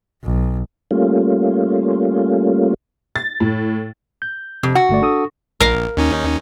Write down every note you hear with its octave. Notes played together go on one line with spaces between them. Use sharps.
B1
G3 A3 A#3 C#4 F4
A6
A2
G6
F2 C3
F#4 F#5
G1 A3 D5
D4 A4 D#6
A#1 A#4 F5
D#2 C#4 D#4